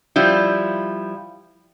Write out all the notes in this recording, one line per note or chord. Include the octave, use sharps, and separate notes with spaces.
F3 G3 E4